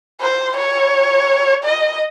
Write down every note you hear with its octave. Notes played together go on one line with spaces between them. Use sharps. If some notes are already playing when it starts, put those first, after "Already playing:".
C5
C#5
D#5